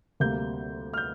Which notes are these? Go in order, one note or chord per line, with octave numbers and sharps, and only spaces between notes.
D2 C3 G3 A#3 G6
F6
G6